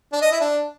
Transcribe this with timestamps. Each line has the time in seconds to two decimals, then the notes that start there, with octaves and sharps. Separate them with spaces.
0.12 D4
0.22 D#5
0.31 E4
0.41 D4